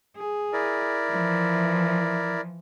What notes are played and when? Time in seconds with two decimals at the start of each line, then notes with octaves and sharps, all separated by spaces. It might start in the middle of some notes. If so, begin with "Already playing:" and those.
0.16 G#4
0.53 E4 A#4 D5
1.08 E3 F3